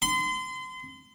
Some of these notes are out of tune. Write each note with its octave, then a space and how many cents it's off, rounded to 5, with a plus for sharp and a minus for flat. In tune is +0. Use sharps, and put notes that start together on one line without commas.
C6 -35